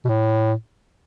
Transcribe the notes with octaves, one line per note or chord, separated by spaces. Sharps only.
B2
A2